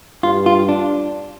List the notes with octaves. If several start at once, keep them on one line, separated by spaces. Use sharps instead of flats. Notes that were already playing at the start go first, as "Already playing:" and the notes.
G2 F4
F4
D4